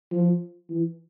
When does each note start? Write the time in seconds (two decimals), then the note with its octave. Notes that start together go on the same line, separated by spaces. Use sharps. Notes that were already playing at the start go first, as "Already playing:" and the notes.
0.12 F3
0.70 E3